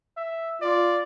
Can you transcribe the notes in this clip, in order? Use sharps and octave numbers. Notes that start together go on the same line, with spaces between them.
E5
F4 D5